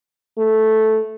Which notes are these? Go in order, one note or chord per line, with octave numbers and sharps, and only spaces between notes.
A3